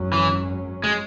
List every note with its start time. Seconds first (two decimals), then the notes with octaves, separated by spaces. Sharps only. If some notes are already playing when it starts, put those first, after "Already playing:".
Already playing: G#1 F#2 F#3 C#4
0.13 E3
0.84 G#3